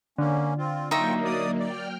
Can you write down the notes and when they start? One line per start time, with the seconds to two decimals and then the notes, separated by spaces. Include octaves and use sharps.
0.18 D3 A#3 C#4
0.58 C4 F4
0.91 F#3 A#3 D#4 F4 E5 G5 C#6
1.25 D5 D#6
1.59 D5 G5 F6